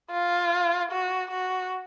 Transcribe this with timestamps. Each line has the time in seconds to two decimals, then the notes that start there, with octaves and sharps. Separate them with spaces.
0.11 F4
0.92 F#4
1.31 F#4